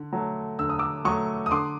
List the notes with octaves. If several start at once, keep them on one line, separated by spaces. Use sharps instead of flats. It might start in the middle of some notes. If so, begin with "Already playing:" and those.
Already playing: D3
F#3 A3
D3 E6
D#6
D6 E6
F#3 A3 C#6 D#6
D#6
D3 C6 D6